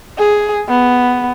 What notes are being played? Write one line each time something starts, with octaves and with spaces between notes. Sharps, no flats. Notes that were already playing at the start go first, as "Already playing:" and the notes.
G#4
B3